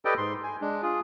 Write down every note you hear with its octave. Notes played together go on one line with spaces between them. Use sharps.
G4 A4 B4 D5 D#5 G5
G#2 C6
G#5
G#3 D4
F4 G#4